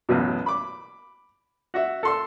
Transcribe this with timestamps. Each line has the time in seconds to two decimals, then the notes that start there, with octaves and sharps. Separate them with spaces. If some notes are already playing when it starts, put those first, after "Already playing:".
0.09 A1 F#2 B2
0.46 B5 D6
1.74 F#4 E5
2.03 A4 C6 E6